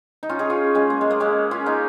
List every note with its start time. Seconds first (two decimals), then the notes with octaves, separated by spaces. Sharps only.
0.23 D#4
0.29 C#4 F4
0.39 D#4 G#4
0.50 C#4 F4
0.75 G#3 C#4
0.90 A#3
1.01 G#3
1.11 A#3
1.20 G#3 C#4
1.51 C#4 F4
1.66 A#3 D#4